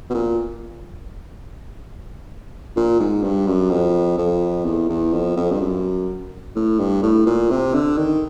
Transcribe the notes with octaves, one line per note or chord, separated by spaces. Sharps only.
B2
A#2
A#2
G#2
G2
F#2
F2
F2
E2
E2
F2
F2
G2
F#2
A2
G2
A2
A#2
C3
D3
D#3